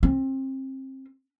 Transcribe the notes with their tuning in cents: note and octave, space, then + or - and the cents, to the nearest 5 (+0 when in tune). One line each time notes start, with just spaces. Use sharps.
C4 +30